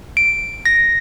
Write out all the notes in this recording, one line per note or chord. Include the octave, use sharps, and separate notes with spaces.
D7
A#6